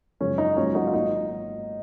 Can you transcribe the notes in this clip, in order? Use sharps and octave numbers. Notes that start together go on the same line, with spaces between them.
F#2 C#3 F3 G#3 C#4
D#4
G#1 G#2 F#3 A#3 C#4 F4
D#4 F#4
F4
G#1 G#2 F#3 A#3 D#4